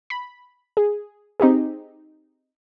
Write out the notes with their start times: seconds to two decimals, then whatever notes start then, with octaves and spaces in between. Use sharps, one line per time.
0.10 B5
0.77 G#4
1.40 C4 D#4 G4 G#4